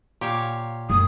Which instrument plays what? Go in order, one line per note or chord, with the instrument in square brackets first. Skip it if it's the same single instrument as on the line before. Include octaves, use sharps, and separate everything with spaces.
[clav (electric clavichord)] A#2 [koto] G4 C#5 F5
[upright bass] F#2 [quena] D#6